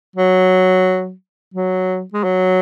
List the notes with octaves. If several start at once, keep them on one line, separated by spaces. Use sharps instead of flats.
F#3
F#3
G#3
F#3